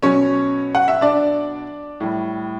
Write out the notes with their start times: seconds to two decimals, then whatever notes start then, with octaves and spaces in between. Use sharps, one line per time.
0.03 B2 F#3 C#4 C#5
0.75 F#5
0.88 E5
1.01 D4 D5
2.00 A2 G3